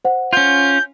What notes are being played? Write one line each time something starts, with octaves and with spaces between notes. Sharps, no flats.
C5 F#5
C#4 F4 G6